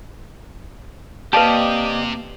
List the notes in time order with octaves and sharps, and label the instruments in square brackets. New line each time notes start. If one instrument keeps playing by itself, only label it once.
[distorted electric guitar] C3 [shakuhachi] A#3 [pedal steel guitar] G4 D5 D#5 [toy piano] B4 F5 A5